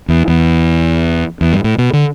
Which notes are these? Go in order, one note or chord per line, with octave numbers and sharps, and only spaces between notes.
E2
E2
E2
G2
A2
B2
D3